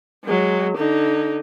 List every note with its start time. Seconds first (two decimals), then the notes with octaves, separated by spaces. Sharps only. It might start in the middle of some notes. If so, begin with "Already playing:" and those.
0.25 F#3 G#3
0.77 D3 D#4